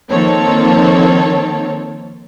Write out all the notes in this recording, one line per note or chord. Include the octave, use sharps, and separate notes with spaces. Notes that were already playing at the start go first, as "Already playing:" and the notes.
D#3 F3 A#3 C4 A4 C#5